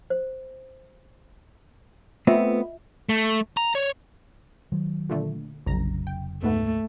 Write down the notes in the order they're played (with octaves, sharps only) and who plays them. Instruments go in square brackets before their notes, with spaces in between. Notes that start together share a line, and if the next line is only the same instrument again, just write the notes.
[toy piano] C5
[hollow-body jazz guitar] A3 B3 C4 [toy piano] F4 D#5 E5
[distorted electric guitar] A3
A#5
C#5
[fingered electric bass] D#3 F#3
[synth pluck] A#2 D3 A3
[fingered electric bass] F1 C#3 F#3 [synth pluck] A#1 A#5 A#6
[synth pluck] G5
[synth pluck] D2 G#2 B3 [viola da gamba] A3